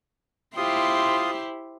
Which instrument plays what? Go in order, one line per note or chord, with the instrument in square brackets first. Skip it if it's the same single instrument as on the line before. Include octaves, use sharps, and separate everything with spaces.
[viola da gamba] E4 G4 C5 [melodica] F4 C6 D#6